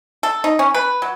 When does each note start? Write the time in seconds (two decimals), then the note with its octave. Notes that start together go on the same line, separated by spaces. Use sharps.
0.23 A4
0.44 D#4
0.59 C#4
0.74 B4
1.02 F#3